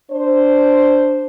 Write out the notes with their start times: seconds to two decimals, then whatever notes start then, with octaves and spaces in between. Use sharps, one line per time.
0.11 D4 C5